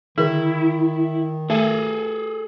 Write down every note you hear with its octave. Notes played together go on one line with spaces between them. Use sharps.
D3 D#3 E4 G#4
A3 G#4 A4